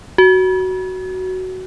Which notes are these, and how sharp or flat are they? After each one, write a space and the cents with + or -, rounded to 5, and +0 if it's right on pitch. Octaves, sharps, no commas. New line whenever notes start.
F#4 +10